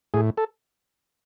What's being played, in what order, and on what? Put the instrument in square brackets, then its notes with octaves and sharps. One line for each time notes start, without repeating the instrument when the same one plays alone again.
[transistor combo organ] A2 G#4
A4